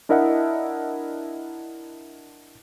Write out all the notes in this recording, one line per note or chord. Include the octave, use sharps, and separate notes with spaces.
D4 E4 A#4 D#5 E5 F#5